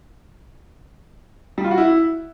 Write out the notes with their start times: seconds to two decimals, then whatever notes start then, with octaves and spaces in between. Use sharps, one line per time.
1.58 G3
1.64 F4
1.71 F#4
1.78 E4